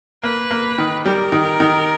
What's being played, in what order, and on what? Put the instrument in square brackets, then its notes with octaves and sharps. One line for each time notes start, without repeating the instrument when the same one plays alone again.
[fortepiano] A#3 [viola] B4
[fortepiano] A#3
D#3
[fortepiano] G3 [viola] A#4
[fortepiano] D#3
D#3